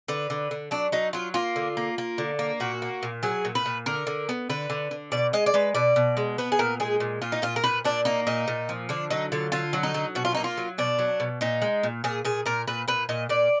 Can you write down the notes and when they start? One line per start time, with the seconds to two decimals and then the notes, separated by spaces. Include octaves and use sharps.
0.08 D3 B4
0.30 D3
0.51 D3
0.71 F#3 D4
0.92 F#3 D#4
1.13 F#3 F4
1.34 A#3 F4
1.56 D3
1.77 A#3
1.98 A#3
2.18 D3
2.39 A#3
2.60 A#2 F#4
2.82 A#3
3.03 A#2
3.23 F#3 G#4
3.45 A#2
3.55 B4
3.66 A#2
3.86 D3 A#4
4.07 D3
4.29 B3
4.49 D3 B4
4.70 D3
4.91 D3
5.12 B2 D5
5.33 G#3 D#5
5.46 D5
5.54 G#3 B4
5.74 B2 D5
5.96 B2
6.17 G#3
6.38 B3 B4
6.52 G#4
6.59 A#2 A#4
6.80 G#3 G#4
7.00 A#2
7.22 A#2 F4
7.32 D#4
7.42 A#2 F4
7.56 A#4
7.64 A#2 B4
7.84 A#2 D4
8.05 A#3 D#4
8.27 A#2 D#4
8.48 A#2
8.69 F3
8.89 D3 D4
9.10 F#3 D#4
9.32 D3 F4
9.52 D3 F4
9.73 F#3
9.83 D#4
9.94 F#3
10.15 B2 F#4
10.25 F4
10.35 A#3 D#4
10.44 F4
10.57 F#3
10.78 B2 D4
10.99 F#3
11.20 B2
11.41 A#2 D#4
11.62 G#3
11.83 A#2
12.04 A#2 G#4
12.25 A#2 G#4
12.46 A#2 A#4
12.68 A#2 B4
12.88 A#2 B4
13.09 A#2 D#5
13.29 A#2 D5